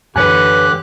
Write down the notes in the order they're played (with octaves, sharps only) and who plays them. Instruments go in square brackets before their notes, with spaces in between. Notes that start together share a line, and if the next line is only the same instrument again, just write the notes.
[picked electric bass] F#2 E3 [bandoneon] D3 G4 F#6 [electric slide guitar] B4 C#5 G#5